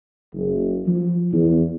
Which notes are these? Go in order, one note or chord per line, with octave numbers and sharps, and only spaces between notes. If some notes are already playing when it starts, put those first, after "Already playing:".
F#1
F3
E2